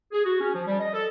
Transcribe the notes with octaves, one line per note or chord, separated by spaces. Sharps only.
G#4
F#4
C#4
F3
G3
D#5
A4